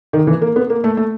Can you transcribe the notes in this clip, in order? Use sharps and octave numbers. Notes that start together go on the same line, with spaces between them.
D#3
E3
A#3
B3
A#3
A3
A3